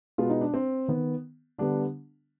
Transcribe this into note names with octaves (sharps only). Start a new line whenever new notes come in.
B2 G#3 B3 F4
D#4
D4
C4
D#3 B3
D3 G3 B3 D4